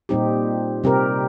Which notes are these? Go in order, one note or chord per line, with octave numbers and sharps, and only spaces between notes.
A#2 G3 C4 D#4 G4
C3 G3 C4 G4 A#4